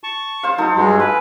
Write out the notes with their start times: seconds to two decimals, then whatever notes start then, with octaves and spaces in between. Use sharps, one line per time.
0.04 A5 C#6
0.43 C5 F5
0.58 F#3 D#4 A4
0.77 G2 F#3 G#3 B5
1.00 G#3 B4